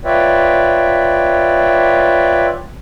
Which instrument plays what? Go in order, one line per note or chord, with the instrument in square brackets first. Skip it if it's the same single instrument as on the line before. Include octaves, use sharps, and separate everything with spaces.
[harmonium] F4 B4 C#5 D5 E5 G5